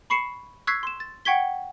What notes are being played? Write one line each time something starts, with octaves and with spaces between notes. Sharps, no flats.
B5 C#6 C7 C#7 E7
C#6 E6 F#6 G#6 B6 C7
C6 E7
A6
F#5 G5 C#6 G#6 B6 G7